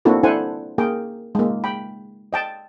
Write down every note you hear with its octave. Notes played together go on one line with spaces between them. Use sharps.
A#3 C4 D4 E4 F#4 A4
D4 E4 A4 C5 F#5 G#5
A#3 G#4 A#4 G5
G#3 A#3
G5 B5
D#5 G5 A5